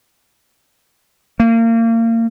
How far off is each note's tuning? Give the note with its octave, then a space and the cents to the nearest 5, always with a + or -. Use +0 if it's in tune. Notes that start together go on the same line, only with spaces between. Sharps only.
A#3 -30